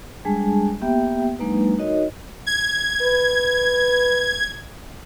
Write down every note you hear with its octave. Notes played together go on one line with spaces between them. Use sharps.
G3 G#3 D4 G#4 G#5 A5
A#3 B3 G4 E5 G5
F#3 G#3 A#3 D4 D#4 B4
D#4 F#4 A#4 C#5 D#5
G#6
B4